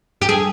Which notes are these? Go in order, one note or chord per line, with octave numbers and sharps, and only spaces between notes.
G4
G#4